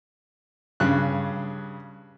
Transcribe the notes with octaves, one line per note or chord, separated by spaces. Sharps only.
G2 C#3 F#6